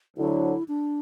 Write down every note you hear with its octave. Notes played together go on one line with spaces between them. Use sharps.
D2 D3 F#3 E4
D4